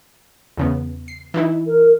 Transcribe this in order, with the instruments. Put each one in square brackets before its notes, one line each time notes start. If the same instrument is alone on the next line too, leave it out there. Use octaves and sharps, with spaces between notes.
[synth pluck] E2 C#3 B3
C7
E3 D#4 E4
[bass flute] A#4